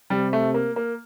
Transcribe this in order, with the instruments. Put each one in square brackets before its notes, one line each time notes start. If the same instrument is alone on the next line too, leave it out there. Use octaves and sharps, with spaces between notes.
[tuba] C3 [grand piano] G3
[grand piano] A3
A#3
A#3